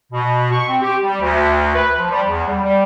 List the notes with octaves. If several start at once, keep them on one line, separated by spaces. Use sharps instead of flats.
B2
C#6
C4
G4
G3
D2
B4
F3
G3
E2
G3
G3